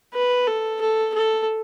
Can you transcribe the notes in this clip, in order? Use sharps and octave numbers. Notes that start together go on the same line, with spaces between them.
B4
A4
A4
A4